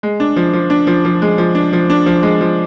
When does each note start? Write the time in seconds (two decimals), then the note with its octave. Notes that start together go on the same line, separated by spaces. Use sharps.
0.03 G#3
0.20 D4
0.36 F3
0.53 F3
0.70 D4
0.87 F3
1.05 F3
1.22 G#3
1.38 F3
1.55 D4
1.73 F3
1.90 D4
2.06 F3
2.23 G#3
2.41 F3